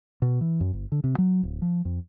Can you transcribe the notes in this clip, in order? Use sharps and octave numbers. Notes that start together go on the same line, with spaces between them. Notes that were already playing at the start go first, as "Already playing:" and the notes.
B2
E3
F#2
G1
D3
C3
F#3
D1
F3
F2